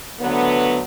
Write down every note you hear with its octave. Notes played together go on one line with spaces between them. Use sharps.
D2 D3 F#3 B3